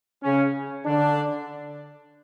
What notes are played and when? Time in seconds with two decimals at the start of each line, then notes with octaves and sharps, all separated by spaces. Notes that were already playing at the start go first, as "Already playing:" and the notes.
0.24 C#3 C#4
0.86 D3 D4